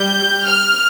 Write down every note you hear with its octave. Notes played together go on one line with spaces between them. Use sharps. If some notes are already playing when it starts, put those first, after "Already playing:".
Already playing: G3 G6
F6